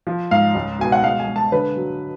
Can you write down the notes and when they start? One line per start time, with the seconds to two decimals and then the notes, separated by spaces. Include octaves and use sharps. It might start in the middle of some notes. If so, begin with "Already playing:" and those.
0.07 F3
0.31 G#2 F5
0.55 C#2
0.79 B2 G#5
0.92 F#5
1.03 G#3 F5
1.20 G#5
1.27 G#3
1.36 A5
1.52 D3 B4
1.76 F#3